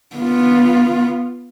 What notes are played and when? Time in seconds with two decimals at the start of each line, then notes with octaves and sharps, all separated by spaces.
0.16 B3 F4